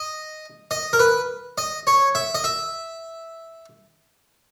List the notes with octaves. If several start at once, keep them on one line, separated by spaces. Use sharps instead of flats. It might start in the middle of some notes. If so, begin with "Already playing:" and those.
Already playing: D#5
D#5
A#4
B4
D#5
C#5
E5
D#5
E5